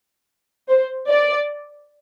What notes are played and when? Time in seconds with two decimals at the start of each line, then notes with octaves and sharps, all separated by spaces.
0.69 C5
1.10 D5